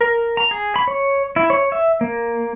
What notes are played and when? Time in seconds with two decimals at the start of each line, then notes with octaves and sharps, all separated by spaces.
0.01 A#4
0.37 A#5
0.51 G#4
0.76 B5
0.88 C#5
1.36 E4
1.50 C#5
1.72 E5
2.01 A#3